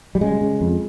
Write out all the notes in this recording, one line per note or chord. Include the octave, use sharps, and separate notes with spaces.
G3
C#3 G#3
C#3
F2